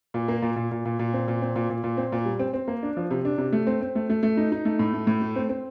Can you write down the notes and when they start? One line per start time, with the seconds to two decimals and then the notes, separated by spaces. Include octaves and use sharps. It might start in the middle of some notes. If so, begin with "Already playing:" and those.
0.14 A#2
0.28 A#3
0.42 A#2
0.56 A#2
0.71 A#2
0.85 A#2
0.99 A#2
1.13 C4
1.28 A#2
1.42 C4
1.56 A#2
1.70 A#2
1.84 A#2
1.97 C4
2.12 A#2
2.25 G3
2.39 C4
2.53 C4
2.68 A#3
2.83 D4
2.97 F3
3.11 C3
3.25 D4
3.38 C3
3.52 A3
3.67 C4
3.81 C4
3.95 A3
4.10 A3
4.23 A3
4.37 D#4
4.52 D#4
4.65 A3
4.79 A2
4.94 A3
5.07 A2
5.22 A3
5.36 C4
5.49 C4